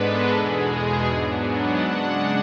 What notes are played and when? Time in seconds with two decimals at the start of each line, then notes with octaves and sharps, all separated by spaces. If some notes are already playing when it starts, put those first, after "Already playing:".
Already playing: G#2 G#3 B3 D4 A4 B4
0.31 E2 B2 G#3 G#4
1.07 G#2 F#3 B3 D4
1.45 F#5
1.83 C#3 G#3 D4